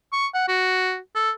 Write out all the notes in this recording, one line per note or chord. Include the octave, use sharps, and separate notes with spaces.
C#6
F#5
F#4
A4